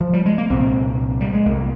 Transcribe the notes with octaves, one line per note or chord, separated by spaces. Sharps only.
F3
G3
G#3
A#3
C2 A#2 C4
G3
G#3
C2 A#2 A#3